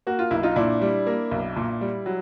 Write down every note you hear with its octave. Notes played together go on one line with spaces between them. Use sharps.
A#3 F#4
F4
B1 E4
D#4 F4
A#2 D4 E4
G3
A#3
B1
A#2
G3
F#3